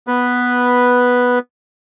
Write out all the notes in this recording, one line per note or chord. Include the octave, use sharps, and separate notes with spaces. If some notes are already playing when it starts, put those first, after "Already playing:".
B3 B4